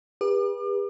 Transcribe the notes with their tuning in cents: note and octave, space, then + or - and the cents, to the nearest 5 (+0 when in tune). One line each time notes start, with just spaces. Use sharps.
G4 +40 B4 -30 D6 +40